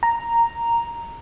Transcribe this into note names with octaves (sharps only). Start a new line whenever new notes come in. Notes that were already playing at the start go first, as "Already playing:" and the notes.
A#5